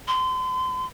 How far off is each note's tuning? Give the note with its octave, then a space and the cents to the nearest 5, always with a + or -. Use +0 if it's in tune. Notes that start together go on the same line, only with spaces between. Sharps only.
C6 -30